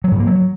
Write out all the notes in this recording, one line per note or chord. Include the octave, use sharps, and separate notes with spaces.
F#3
G#2
A#3
F#3